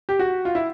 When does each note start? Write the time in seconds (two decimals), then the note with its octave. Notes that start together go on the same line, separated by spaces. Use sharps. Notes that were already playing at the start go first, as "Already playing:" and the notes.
0.09 G4
0.19 F#4
0.45 F4
0.55 E4